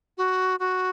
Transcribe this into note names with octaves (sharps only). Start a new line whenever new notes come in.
F#4
F#4